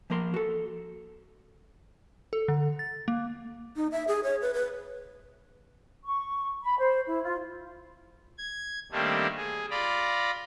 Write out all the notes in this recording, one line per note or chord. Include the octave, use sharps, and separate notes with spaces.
F3 A#3 A#4 C6
F#4 A4
A4
D3
A6
A#3
D#4
E5
G#4
C#5
B4
B4
C#6
B5
C5
E4
F4
G#6
D#3 G3 A3 A#3 C4 D4
G#4
F4 D5 A#5 B5